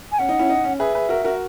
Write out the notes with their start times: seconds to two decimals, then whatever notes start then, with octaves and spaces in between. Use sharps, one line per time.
0.12 G#5
0.19 C#4 F#5
0.29 D#4
0.39 C#4 E4
0.49 D#4
0.64 C#4
0.79 G#4 B4 E5
0.95 G#4 B4
1.09 F#4 A#4
1.24 F#4 A#4